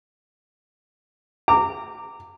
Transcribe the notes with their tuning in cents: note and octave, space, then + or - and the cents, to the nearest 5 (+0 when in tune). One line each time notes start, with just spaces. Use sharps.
A#5 -25 D6 +0